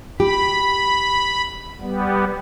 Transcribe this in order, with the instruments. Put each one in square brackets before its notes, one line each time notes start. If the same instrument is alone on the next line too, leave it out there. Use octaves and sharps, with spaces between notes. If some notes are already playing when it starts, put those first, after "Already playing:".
[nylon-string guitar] G4 [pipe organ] B5
[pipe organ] G3 B3